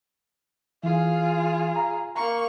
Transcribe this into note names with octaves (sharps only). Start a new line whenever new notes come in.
E3 F4 G#4
A#5
A#3 A#5 C#6